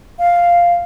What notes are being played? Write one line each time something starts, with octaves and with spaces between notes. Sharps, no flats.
F5